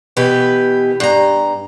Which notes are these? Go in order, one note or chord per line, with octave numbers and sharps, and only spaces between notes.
B2 E3 G4 B4
G2 A#5